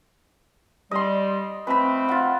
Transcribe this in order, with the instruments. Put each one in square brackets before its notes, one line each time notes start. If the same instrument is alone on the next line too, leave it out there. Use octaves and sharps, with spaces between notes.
[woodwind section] G3 [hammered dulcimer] D#5 C6
[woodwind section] F3 A3 C4 [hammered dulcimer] B4 B5
[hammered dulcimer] F4 F#5